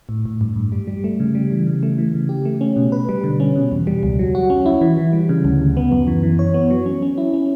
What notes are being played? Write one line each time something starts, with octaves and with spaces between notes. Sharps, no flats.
A2
A2
G2
G2
G3
G3
A3
C#3
G3
E3
C#3
A3
E3
C#3
G4
A3
C#4
B2
B4
G3
D3
C#4
B2
E2
G3
C#2
F#3
F#4
C#4
E4
E3
E3
G3
C#3
D2
D2
B3
F#2
E3
E3
C#5
B3
F#3
C#4
C#4
E4
C#4